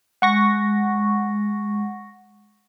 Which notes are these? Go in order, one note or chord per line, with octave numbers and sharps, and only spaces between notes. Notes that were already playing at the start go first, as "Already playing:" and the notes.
G#3 F#5 C#6 A#6